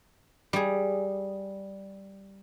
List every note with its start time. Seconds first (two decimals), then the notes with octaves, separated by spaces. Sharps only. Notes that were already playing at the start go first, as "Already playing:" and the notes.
0.53 G3 G#4